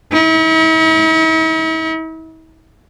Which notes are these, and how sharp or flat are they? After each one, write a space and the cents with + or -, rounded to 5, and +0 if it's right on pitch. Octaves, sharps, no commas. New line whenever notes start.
E4 -45